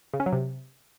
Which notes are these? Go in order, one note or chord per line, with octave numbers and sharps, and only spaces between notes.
C#3
C#4
F#3
C3